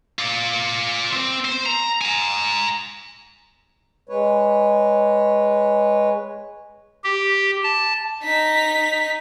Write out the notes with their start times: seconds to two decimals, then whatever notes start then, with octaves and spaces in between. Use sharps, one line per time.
0.19 F4 D5
1.13 C4
1.45 C5
1.66 A#5
2.01 G#5 A#5
4.09 G#3 B4 C#5
7.04 G4
7.63 A5
8.23 D#4 B6